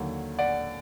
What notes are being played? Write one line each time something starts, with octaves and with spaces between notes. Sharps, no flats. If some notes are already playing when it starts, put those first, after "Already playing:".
Already playing: D#2 D3 F#3
D5 F#5